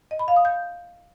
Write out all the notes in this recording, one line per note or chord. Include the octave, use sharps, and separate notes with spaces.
D#5
B5
F5
D#6
G6